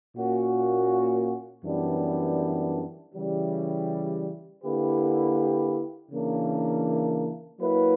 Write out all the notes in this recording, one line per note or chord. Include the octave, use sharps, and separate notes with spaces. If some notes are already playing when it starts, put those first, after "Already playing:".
A#2 A#3 C#4 F#4
F#2 E3 G3 B3 D4
C#3 E3 G3
D3 A#3 E4 G4 B4
C#3 E3 A#3 D4
F#3 A#3 E4 B4